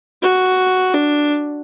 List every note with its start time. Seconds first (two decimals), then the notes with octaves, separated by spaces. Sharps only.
0.23 F#4
0.94 D4